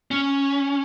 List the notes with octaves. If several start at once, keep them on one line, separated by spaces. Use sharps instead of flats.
C#4